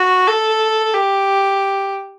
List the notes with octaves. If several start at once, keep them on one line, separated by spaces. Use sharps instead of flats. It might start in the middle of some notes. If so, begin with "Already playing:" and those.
Already playing: F#4
A4
G4